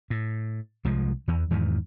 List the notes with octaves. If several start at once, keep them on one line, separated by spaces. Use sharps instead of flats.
A2
C2 F3 G#3
E2 E3
E2 G#2 D#3 E3